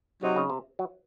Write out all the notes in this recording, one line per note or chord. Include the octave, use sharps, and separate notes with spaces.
C3 F#3 C4 D#4 F#4 C5
C#3
C3
F#3